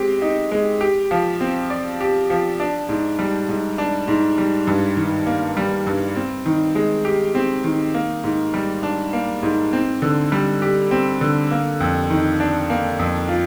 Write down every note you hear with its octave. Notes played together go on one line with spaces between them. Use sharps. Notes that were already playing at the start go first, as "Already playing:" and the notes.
Already playing: G#3 C4 G4
D#4
G#3
G4
F3
C4
D5
G4
F3
D4
G#2
G3
G#2
D4
G#2
G3
G2
D#3
A#3
G3
G2
C4
D#3
G#3
G4
C4
D#3
A#3
G#2
G3
D4
A#3
G#2
C4
D3
G3
G4
C4
D3
A#3
F2
D#3
D4
A#3
F2
F4